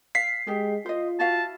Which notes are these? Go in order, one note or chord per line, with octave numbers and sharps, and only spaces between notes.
F5 B6 C7
G#3 G4 G#4
F4 C5 D#5
E4 F#4 F5 A5